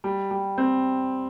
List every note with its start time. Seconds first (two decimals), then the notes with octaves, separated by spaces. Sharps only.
0.04 G3
0.31 G3
0.58 C4